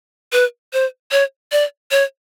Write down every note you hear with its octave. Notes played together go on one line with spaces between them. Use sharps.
B4
C5
C#5
D5
C#5